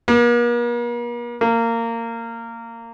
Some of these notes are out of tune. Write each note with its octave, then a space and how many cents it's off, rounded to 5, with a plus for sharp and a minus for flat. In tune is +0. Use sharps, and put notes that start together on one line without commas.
A#3 +45
A#3 -20